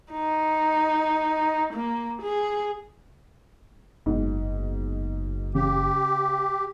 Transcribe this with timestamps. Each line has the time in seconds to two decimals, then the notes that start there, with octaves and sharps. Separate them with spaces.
0.11 D#4
1.74 A#3
2.22 G#4
4.06 F#1 G#2 B2
5.55 C#3 G4